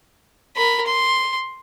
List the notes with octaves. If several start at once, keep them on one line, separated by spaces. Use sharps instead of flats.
A#4 B5
C6